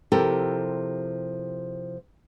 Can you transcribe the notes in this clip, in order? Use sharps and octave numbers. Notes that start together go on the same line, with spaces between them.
C3 F3 E4 G4 A4 A#4